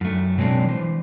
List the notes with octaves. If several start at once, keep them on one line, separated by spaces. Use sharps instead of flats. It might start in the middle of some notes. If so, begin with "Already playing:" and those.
F#2 A3
B2 F#3 G#3 C4 D4
E3 C5